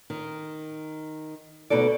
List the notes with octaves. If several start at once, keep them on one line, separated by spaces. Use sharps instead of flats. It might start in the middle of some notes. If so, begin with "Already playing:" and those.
D#3
D2 B2 D#4 A4 D5